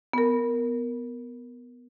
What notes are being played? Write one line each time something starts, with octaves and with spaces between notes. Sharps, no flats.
B3 A#4